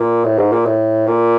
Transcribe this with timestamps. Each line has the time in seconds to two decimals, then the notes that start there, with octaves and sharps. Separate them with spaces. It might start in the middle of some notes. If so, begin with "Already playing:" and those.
Already playing: A#2
0.25 A2
0.38 G#2
0.52 A#2
0.65 A2
1.07 A#2